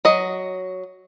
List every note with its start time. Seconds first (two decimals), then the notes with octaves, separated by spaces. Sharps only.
0.05 F#3 D#5